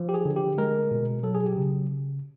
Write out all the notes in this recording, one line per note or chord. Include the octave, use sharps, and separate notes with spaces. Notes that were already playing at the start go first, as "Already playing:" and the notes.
Already playing: F3
G4
G#4
D3
G4
G#3 A#4
B2
F#3 A4
G#4
G4
C#3